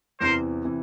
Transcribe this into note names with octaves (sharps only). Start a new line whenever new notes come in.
E2 C3 E3 A#4 C5
C3 E3